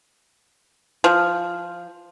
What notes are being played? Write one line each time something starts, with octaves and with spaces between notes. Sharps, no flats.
F3